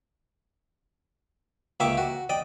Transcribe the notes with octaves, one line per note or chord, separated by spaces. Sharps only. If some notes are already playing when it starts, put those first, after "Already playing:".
C#2 A#3 E5 G5 C#6 D6
F#4
D5 D#5 G5